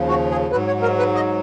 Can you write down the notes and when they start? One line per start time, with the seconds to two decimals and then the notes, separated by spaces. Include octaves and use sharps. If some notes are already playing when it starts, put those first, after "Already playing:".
Already playing: D#2 C#3 F3
0.09 F#4
0.31 G#4
0.51 F#3 B4
0.54 G#2
0.67 C#5
0.82 A#4
0.99 B4
1.15 D#5